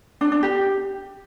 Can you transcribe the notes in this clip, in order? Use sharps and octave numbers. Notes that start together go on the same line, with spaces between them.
D4
D4
G4